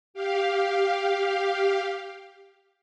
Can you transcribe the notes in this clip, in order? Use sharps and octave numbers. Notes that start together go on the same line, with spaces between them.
G4 F5